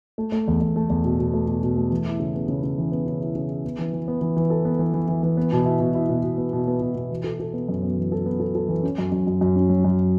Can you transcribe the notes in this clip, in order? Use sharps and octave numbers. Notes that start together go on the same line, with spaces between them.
A3
A3
E2
E2
A3
E2
B2
B2
A3
B2
B2
A3
E3
E4
C#3
B3
C#3
C#3
E3
B3
C#3
E4
C#3
E4
B3
E3
E3
B3
E3
E3
A4
B3
E3
E3
E3
E3
B3
B2
E4
B2
E4
B2
B2
B3
B2
B3
B2
B2
E3
A4
A4
B3
F#2
B3
E3
A4
B3
A4
A4
E3
C#4
F#2
F#2
F#2
F#2
C#4
F#3
F#2